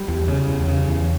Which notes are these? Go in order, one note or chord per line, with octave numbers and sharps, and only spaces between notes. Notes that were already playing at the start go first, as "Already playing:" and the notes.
Already playing: G3
E2
C#3
E2
C#3
E2